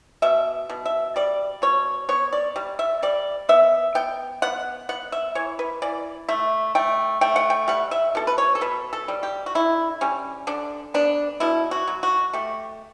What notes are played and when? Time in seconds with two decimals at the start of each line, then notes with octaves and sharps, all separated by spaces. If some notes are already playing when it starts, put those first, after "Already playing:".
0.22 B2 E5
0.70 B2
0.86 E5
1.16 G3 D5
1.62 B2 C#5
2.09 B3 C#5
2.33 D5
2.56 G3
2.79 E5
3.03 G3 D5
3.49 B3 E5
3.95 B3 G5
4.42 B3 F#5
4.89 B3 F#5
5.12 E5
5.35 E3 C#5
5.59 B4
5.82 E3 D5
6.29 A3 E5
6.75 A3 G5
7.21 A3 G5
7.36 F#5
7.50 G5
7.68 G3 F#5
7.91 E5
8.15 B2 A4
8.27 B4
8.38 C#5
8.55 A4
8.61 B2 B4
8.93 A4
9.08 G3
9.23 G4
9.46 F#4
9.55 D3 E4
10.01 G3 C#4
10.47 D3 D4
10.94 B3 D4
11.40 B2 E4
11.71 F#4
11.87 F#3
12.03 F#4
12.34 A3 G4